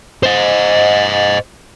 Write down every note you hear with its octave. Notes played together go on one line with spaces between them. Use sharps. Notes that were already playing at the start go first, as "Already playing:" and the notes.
C5 D#5